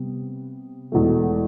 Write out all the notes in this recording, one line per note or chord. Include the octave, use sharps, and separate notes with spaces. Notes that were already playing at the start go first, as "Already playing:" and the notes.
Already playing: C3 G3 B3
E1 E2 B2 A3